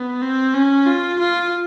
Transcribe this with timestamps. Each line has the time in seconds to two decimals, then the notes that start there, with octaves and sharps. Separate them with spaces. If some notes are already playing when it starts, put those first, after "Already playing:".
Already playing: B3
0.22 C4
0.54 C#4
0.86 F4
1.19 F4